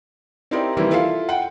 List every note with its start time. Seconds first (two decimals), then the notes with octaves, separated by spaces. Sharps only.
0.51 C4 D#4 E4 G4 A#4 D5
0.77 D#3 E3 G3 A#3 C4 E4
0.91 E4 F4 A4 F5
1.29 F#5 G5